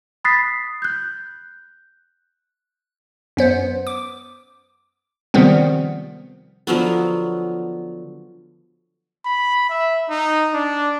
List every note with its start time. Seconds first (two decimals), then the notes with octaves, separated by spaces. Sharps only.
0.24 B5 D#6 F#6 A6 B6 C7
0.82 F#6 G6
3.37 F#2 B3 C5
3.87 D6
5.34 C3 D#3 F3 G3 B3 C4
6.67 D3 F3 F#3 B3
9.25 B5
9.70 E5
10.10 D#4
10.54 D4